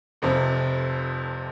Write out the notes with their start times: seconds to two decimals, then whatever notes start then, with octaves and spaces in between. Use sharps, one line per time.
0.22 F1 F2 C3 F3